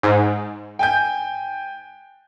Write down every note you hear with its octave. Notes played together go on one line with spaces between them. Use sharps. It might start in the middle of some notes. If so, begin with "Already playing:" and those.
G#2
G5 G#5 G6